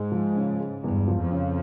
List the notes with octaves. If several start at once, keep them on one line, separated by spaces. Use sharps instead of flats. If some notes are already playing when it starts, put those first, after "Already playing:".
Already playing: G#2 G#3
F3
C#3
G#3
E2 G2
F3
F2
C#3